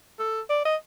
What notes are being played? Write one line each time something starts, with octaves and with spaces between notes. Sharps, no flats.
A4
D5
D#5